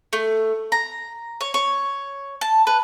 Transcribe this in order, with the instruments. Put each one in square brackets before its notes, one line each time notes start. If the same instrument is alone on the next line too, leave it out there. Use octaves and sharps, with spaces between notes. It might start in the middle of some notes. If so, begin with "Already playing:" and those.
[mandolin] A3
A#5
C#5
C#5
A5
B4